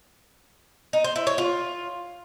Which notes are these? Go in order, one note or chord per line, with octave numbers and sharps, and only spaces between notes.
D#4
C5
E4
C#5
F4